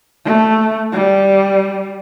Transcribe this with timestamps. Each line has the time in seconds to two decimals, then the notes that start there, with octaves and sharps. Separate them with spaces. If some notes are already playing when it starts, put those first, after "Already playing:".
0.25 A3
0.92 G3